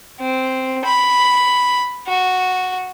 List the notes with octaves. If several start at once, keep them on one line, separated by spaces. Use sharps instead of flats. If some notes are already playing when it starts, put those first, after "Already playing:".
C4
B5
F#4